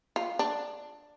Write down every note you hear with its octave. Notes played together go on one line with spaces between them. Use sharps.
F4
D4